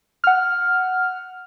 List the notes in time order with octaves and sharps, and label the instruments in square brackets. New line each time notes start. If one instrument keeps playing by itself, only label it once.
[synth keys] F#5 F6